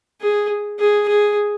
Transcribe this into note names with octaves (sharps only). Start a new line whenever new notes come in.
G#4
G#4
G#4